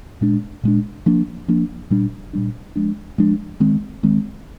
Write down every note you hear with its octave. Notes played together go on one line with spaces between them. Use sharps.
A#2 G#3 D4
A#2 G#3 D4
F3 A#3 D4
F3 A#3 D4
A#2 G3 D4
A#2 G3 D4
F3 G#3 D4
F3 G#3 D4
D#3 G#3 C4
D#3 G#3 C4